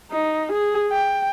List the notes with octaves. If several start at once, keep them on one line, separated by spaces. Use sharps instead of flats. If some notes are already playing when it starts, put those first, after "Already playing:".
D#4
G#4
G5